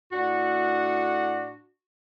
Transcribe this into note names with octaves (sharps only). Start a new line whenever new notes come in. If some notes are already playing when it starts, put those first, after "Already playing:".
A2 D4 F#4 F#5